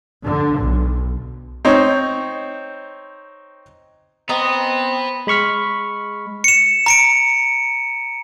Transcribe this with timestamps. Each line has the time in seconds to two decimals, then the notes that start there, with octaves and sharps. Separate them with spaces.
0.23 D3
0.58 B1
1.65 C4 D#4 C5 C#5
4.29 B3 C4 D#5 A#5
5.27 G#3 B5 C#6 F6 B6
6.44 C#7 E7
6.86 A#5 C#7 D7